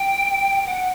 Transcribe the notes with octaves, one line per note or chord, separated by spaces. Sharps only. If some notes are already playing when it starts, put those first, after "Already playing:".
Already playing: G5
F#5